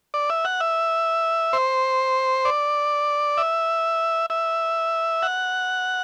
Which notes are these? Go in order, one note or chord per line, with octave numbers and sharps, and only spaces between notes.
D5
E5
F#5
E5
C5
D5
E5
E5
F#5